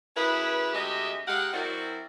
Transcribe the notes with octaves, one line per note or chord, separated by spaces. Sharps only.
F#2 C#4 E4 G#4 B4
D2 C3 G#3 G4 D#5 E5
G#3 D#4 G4 F5 F#5
F#3 C4 E4 F#4 A#4 D5